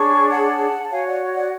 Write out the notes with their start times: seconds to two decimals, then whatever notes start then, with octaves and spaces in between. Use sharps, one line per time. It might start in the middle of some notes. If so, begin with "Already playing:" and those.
Already playing: D4 G#4 C#5 A5 C#6
0.32 F#5 A5
0.83 A5
0.91 F#4 C#5 F5 G#5
1.06 D5 F#5
1.35 D5 F#5